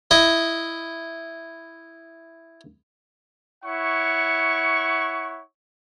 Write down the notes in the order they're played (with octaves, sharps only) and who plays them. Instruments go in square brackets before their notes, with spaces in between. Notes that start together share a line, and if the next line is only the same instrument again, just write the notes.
[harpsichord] E4 D#5
[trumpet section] E4 C#5 F#5 C#6